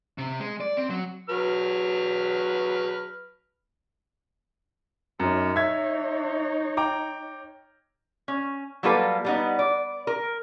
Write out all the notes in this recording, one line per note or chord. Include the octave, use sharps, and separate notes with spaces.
C3
G#3
D5
C4
F#3
F#3 B4 F6
F#2 D#4 C#5
E5 G#6
G5 A#5 D6
C#4
F#3 G3 A#3 F4 A4 B4
G3 B3 D#4
D5
A#4